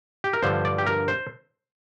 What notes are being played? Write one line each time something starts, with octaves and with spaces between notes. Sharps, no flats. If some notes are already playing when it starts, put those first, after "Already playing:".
G4
A#4
G2 D3 F3 C5
D5
G4
A#4
C5